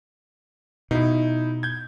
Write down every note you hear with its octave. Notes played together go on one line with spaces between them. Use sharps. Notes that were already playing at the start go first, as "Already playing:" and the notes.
B2 D#4 E4
G6 G#6